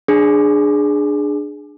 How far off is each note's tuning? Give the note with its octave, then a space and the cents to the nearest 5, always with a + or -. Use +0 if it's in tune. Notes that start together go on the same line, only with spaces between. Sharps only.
D4 +10 G#4 +0